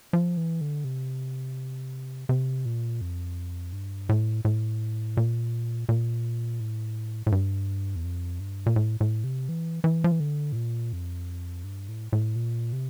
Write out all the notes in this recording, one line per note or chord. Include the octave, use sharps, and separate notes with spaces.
F3
E3
D3
C3
C3
A#2
F2
G2
A2
A2
A#2
A#2
A2
A2
G2
E2
F2
G2
A#2
A2
A2
C3
E3
E3
F3
E3
D3
A2
A#2
F2
G2
A2
A2
A#2
C3